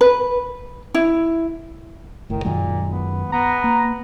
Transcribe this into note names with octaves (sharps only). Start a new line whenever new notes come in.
B4
E4
F#1 A2 D#3
F#2 A#2 D#3 G#3
B3
B3 A#5
A#3